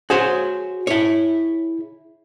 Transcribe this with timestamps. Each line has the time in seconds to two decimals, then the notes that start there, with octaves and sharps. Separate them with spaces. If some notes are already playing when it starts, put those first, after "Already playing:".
0.10 F#4 G#4 C5 C#5
0.87 E4 C#5